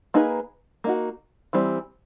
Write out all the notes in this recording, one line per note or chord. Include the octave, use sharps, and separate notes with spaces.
A#3 D#4 G#4 B4
A#3 D#4 F#4
E3 G3 C4